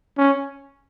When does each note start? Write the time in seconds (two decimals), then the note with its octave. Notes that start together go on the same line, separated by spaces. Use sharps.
0.18 C#4